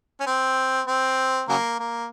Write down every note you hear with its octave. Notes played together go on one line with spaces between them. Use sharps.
C#4
C4
C4
C#3 F#3 A#3
A#3